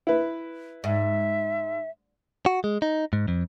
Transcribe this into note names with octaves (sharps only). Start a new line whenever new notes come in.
E4 B4
G#2 E5
F#4
G#3
D#4
G#2
F2